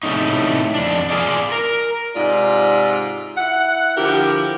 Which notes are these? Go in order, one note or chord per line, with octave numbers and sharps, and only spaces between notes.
A2 C3 G#3 A3 C#4 D#4
F2 D4
F4 G#4 D5
A#4
G#2 C3 F4 D5
E4 F#5
D3 F3 E4 G4 A#4